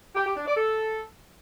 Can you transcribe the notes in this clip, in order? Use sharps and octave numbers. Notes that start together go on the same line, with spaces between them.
G4
G4
D4
D5
A4